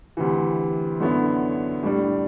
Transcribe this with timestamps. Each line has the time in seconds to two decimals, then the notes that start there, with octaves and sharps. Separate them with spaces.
0.17 D2 C3 E3
1.00 F#2 D3 F#3 B3 E4
1.83 A2 G3 D4